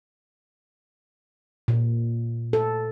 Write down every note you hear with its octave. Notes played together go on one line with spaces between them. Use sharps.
A#2
A4